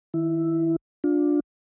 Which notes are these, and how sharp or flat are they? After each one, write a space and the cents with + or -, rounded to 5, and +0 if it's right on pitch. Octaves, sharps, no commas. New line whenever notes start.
D#3 +30 E4 +0
D4 +0 F4 +25